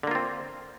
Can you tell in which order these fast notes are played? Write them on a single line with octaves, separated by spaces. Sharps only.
D3 A#3 F4 C4